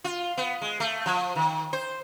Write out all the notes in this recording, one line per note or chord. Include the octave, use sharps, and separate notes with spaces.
F4
B3
G#3
A3
F3
D#3
C5